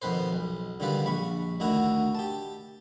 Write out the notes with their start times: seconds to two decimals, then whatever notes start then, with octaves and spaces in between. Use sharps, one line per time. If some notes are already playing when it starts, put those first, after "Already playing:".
0.02 F2 B2 D#3 B4 C5
0.33 B1
0.80 D3 D#3 G3 F4 B4 D5
1.05 A#1 B5 C#6
1.60 D2 D3 D#3 E4 F#4
2.15 G4 A5